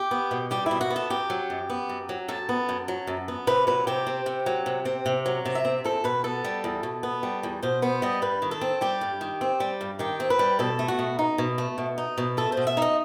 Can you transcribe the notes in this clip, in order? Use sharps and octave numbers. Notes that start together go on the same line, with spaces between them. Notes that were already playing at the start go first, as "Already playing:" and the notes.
Already playing: G4
B3
B2
G3 G4
B2 E4
F#4
B3
A4
F#2 G4
F#3
F#2
B3
F#2
F#3
F#2 A4
B3
F#2
F#3
F#2
B3
C3 B4
F#3 B4
C3 G4
C4
C3
F#3
C3
C4
C3
F#3
C3
E5
C4
E2 A4
B2 B4
B3 A4
G3
E2
B2
B3
G3
E2
B2 C5
B3 C5
G3 D#5
G2 B4
D#3
A4
C4
G3 G4
G2
D#3
C4
G3
G2
D#3 G4
C4
B4
G3
B2 A4
A3
F#4
B2
D#4
B2
A3
B2
D#4
B2
A3 A4
B2 C5
E5
D#4 D#5